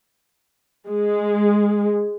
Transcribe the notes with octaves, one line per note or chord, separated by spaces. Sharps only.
G#3